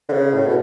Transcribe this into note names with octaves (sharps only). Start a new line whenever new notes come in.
D3
C#3
A2
B2